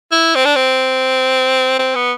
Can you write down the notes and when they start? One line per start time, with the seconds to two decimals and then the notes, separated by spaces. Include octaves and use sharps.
0.12 E4
0.35 C4
0.45 D4
0.56 C4
1.79 C4
1.95 B3